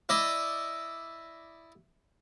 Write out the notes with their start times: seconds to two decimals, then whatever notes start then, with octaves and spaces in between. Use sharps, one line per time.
0.09 E4 D5 D#5